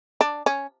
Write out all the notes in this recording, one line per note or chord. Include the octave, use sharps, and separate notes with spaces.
D4
C#4